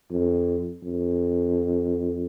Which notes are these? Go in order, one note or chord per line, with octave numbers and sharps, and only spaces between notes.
F2
F2